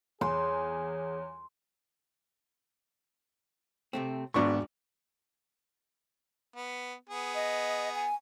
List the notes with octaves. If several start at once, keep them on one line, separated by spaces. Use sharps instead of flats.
E2 G#4 C#5 C6
C3 A3 C4
G#1 G#2 B2 B3 D4 C#6
B3
B3 G#4
D#5
G#5